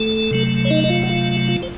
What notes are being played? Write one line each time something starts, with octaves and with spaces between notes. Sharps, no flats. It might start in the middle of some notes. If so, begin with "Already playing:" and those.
Already playing: A3 A4
C3 F#3 A3
C#5
D#4 D#5
D#5
F4 F5
F#5
F4 F5
F4 F5
C5